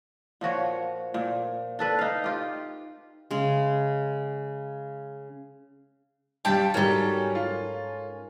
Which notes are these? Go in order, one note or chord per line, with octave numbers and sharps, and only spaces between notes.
A#2 F3 F#4 C#5
A#2
D4 A4 B4
D#4 F5
F4 G4
C#3 G#3
G2 G3 G5 A5
G#2 F#3 G3 C#4 A4 A#4 G#5
F4